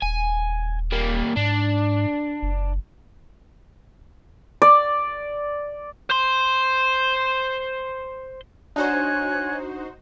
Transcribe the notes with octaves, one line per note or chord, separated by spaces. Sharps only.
D#1 G#5
G3 A#3
G#2 D4
F#1
D5
C5 C6
D4 D#4 F#4 C5 C#5 G#5 F#6